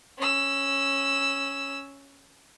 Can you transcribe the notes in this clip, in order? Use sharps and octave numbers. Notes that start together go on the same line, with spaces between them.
C#4 E6